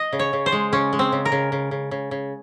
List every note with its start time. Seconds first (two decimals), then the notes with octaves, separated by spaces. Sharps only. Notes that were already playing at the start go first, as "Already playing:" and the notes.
Already playing: D#5
0.13 C#3
0.19 C#5
0.33 C#3
0.46 C5
0.52 G#3
0.72 C#3 C#4
0.93 G#3
0.99 C4
1.12 C#3
1.25 A#4
1.32 C#3
1.52 C#3
1.71 C#3
1.91 C#3
2.11 C#3